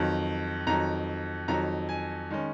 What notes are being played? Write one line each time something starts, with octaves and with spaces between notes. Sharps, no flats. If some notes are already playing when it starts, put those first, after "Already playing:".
Already playing: F2 D#3 F#3
F2 D#3 F#3 A#5
F2 D#3 F#3 A#5
G#5
D#3 G#3 C#4